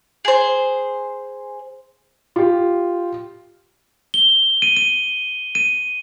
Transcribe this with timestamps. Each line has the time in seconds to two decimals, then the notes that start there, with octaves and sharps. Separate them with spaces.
0.25 G#4 C5
2.36 F4 G4
4.14 G7
4.62 D#7
4.77 D#7
5.55 D#7